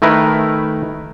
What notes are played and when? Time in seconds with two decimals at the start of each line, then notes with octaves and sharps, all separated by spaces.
0.02 D#3 A3 E4 A#4 B4